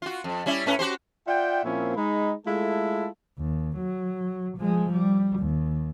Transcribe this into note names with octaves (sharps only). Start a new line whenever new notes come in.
F4 F#4
F2
G3 C#4 E4
A2 C#4 B4
F#4 G4 C5
F4 D5 E5 F#5 G5
A#2 F3 A#3 C4 C#4 E4
G#3 D#4 B5
G#3 A3 E4 F4 A4
D#2
F#3
F3 G#3
G3
D#2